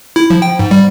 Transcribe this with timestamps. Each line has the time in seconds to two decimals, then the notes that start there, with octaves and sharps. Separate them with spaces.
0.16 E4
0.30 F3
0.42 G5
0.59 G#2
0.71 G3